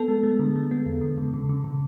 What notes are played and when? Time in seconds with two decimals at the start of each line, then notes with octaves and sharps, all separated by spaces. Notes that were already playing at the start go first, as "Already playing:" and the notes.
Already playing: B3 A4
0.08 G#3
0.23 G#3
0.39 D3
0.56 G#3
0.71 B3
0.86 E2
1.01 D3
1.18 C#3
1.34 C#3
1.49 C#3
1.64 C#3